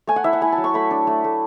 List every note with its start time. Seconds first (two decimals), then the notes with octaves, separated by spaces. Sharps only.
0.07 A3 G#5
0.16 F#5
0.24 E4 E5
0.33 F#5
0.41 E4 G#5
0.52 A5
0.58 F#3
0.64 C#6
0.74 A3 B5
0.91 D4
1.07 A3
1.24 A3